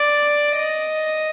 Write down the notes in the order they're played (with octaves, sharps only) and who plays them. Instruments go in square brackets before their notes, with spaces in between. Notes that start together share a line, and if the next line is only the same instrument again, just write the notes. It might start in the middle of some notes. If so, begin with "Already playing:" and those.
Already playing: [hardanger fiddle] D5
D#5